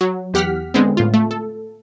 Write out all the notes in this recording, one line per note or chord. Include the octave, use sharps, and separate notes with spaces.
F#3
E2 G4 F#5 F6 B6
D3 G#3 B3 C4
A2 F4
A3
A4